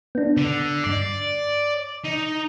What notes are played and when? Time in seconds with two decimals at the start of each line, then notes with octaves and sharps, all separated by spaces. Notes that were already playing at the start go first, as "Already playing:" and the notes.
0.15 B3 D4
0.37 D3
0.84 G2 D5 C7
2.04 D#4